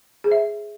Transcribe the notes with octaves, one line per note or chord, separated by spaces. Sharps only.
G#4 C5 E5